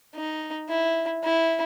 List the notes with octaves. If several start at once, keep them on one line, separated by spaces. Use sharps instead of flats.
D#4
E4
E4